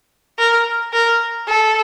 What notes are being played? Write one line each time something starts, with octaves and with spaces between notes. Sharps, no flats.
A#4
A#4
A4